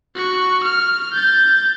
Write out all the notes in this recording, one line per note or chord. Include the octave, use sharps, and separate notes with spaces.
F#4 C#6
F6
G6 A6